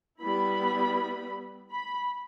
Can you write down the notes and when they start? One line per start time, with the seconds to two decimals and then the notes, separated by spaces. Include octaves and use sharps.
0.21 G3 B3 E4 B5
1.71 B5